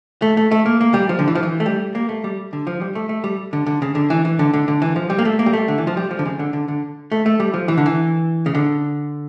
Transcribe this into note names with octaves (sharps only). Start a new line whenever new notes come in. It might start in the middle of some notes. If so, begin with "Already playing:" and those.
A3
A3
A3
A#3
A#3
G3
F3
D3
E3
F3
E3
A3
G3
A#3
A3
G3
D3
F3
G3
A3
A3
G3
D3
D3
C#3
D3
E3
E3
D3
D3
D3
E3
F3
G3
A#3
A3
A#3
G3
A3
D3
E3
F3
G3
F3
D3
C#3
D3
D3
D3
A3
A3
G3
F3
E3
D3
E3
C#3
D3